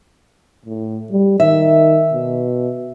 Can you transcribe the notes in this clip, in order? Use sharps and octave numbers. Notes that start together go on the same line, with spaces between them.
A2
G3
D#3 E5
B2